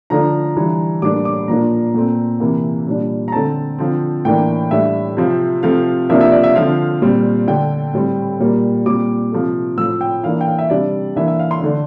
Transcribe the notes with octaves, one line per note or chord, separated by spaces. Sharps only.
D3 F3 A3 D4 A#5
E3 G3 D4
A2 G3 A#3 D4 D6
D6
A#2 F3 A#3 D4 A#5
A#2 A3 C4
C3 E3 A#3
A#2 G3 D4
A#5
D3 A3 C4 A5
D3 F3 C4
A2 E3 A#3 D4 G5
A2 G3 D4 E5
C3 F3 C4
C3 F3 A3 C4 F5
C3 F3 A#3 D4 E5
E5
D5
E5
D3 F3 C4 F5
A#2 G3 C4
D3 A3 D4 G5
A2 G3 C4
A#2 G3 A#3
A#2 G3 C4 D6
C3 F3 A3
A2 F3 C4 E6
G5
E3 A#3 D4 F5
G5
F5
E5
C3 G3 D4 D5
E3 A#3 D4 E5
E5
F5
C6
D3 A3 D4